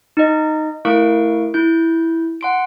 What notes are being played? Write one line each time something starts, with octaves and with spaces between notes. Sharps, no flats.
D#4 D#5
A3 E4 A#4 F5 C#6 D7
E4 G6
F#5 C6 D7